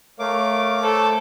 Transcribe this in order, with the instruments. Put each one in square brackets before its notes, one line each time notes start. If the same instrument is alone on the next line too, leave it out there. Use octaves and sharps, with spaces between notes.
[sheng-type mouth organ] A3 D6 [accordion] A#4 C#5 F5
[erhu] A4 [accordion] C5 C#5